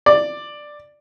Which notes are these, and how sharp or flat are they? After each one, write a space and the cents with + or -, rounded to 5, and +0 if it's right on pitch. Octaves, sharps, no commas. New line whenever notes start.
D5 +10